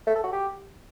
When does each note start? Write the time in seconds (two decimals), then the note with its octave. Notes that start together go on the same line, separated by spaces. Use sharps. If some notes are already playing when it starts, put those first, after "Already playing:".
0.07 A3
0.15 A4
0.24 F#4
0.32 G4